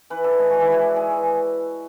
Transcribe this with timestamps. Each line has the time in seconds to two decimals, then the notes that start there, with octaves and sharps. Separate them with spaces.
0.10 E3 B4
0.24 D4 A4
0.38 G#3 G#4
0.50 E3 F#4
0.61 E4
0.68 E3 F#4
0.81 D4
0.96 G#3 G#4
1.10 E3